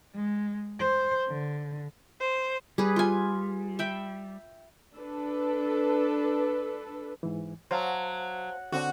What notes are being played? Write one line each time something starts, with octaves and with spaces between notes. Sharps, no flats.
G#3
C5
D3
C5
G3 G#4 B4
F4 G#5
E5 G5 B5
D4 A4 B4
G#2 E3
F#3 C5 F5 A5
D3 C4 D4 F#4